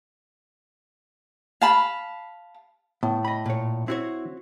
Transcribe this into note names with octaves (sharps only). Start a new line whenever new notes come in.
F5 A5 B5
A2 B3
D#5 B5
A#2 C#5
C4 E4 F#4 C#5